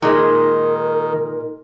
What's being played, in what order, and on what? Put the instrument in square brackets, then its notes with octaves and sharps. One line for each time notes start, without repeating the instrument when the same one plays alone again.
[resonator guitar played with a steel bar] A#2 G#3 [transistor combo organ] D#3 [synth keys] D#4 [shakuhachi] A#4